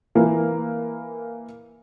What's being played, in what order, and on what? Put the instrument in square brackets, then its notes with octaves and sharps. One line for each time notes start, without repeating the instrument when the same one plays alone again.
[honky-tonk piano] E3 A#3